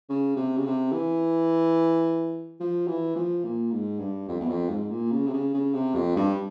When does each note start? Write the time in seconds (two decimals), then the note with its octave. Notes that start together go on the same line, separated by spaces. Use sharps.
0.09 C#3
0.36 C3
0.57 C#3
0.65 C3
0.92 E3
2.60 F3
2.88 E3
3.16 F3
3.44 A#2
3.72 G#2
3.99 G2
4.28 F2
4.41 E2
4.49 F2
4.70 G#2
4.90 A#2
5.12 C#3
5.27 C3
5.33 C#3
5.54 C#3
5.74 C3
5.95 F2
6.16 G2